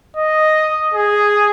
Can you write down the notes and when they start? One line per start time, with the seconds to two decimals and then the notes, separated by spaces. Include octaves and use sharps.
0.17 D#5
0.94 G#4